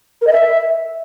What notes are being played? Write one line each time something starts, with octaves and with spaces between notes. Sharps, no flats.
A#4
D#5
E5